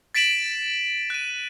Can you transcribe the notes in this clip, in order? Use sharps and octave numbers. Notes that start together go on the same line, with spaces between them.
A6 B6 D7 E7 F#7
F#6 D#7